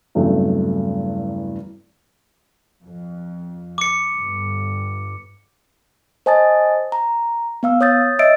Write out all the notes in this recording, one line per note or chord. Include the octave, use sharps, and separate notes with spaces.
E2 G2 C#3 F#3 A3 C4
F2
D6 C#7
G1 G2
C5 D#5 G#5 A5 D#6 A6
A#5
B3 F5 E6
C#5 D#6 G6 A6
C#5 D#5 E5 E6 A6 D7